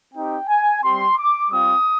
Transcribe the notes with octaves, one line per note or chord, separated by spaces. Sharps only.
C4 D#4 G4 G5
G#5
G3 C4 G4 C6
D6
G3 C4 F4 D#6